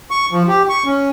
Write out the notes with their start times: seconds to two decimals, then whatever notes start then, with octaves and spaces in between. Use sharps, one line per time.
0.11 C#6
0.32 F3
0.48 G4
0.69 C#6
0.86 C#4